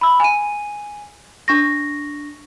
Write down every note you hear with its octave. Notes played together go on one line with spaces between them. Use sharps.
B5 E6
G#5 D#7
D4 C#6 A#6